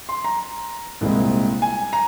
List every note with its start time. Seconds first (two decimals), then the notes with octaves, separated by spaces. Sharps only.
0.09 C6
0.24 A#5
1.01 C2 A#2 G#3 C4
1.62 G#5
1.93 A#5